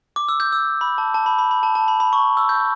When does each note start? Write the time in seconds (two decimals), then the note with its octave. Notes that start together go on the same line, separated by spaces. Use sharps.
0.16 D6
0.29 E6
0.40 G6
0.52 E6
0.81 B5
0.98 A5
1.14 A5
1.26 B5
1.38 B5
1.51 B5
1.63 A5
1.75 A5
1.88 B5
2.00 B5
2.13 C#6
2.37 E6
2.49 G6